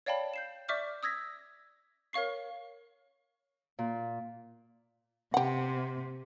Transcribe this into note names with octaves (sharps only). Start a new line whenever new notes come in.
C#5 D5 F5 G5 A5 B5
G6 C7 E7
D5 E5 C#6 D6 F6 G6
D#6 E6 G#6 A#6 B6
A#4 C#5 F5 C#6 C7
A#2
C3 G4 F#5